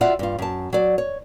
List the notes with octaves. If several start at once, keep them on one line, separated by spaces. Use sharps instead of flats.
F4 F#4 D5 E5 F#5
G2 F4
F#2 A5
F#3 D5
C#5